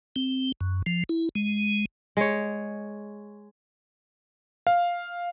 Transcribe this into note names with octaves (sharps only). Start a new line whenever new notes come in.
C4
F#2
F3
E4
G#3
G#3 C#5
F5